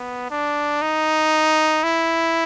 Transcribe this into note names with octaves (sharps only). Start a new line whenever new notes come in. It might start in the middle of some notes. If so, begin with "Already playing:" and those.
Already playing: B3
D4
D#4
E4